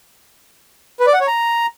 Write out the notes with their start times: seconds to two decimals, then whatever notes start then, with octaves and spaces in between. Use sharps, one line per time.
1.00 B4
1.07 D5
1.14 F#5
1.20 C#5
1.27 A#5